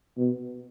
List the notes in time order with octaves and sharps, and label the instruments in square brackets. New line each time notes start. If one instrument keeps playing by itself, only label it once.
[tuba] B2